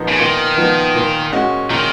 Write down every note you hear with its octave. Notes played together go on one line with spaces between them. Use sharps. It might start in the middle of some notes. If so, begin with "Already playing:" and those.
Already playing: A#2 F3 B3 D#4
C#3
A#2 D#3
F3 B3 D#4
A#2
G#3 C#4 F#4
A#2 D#3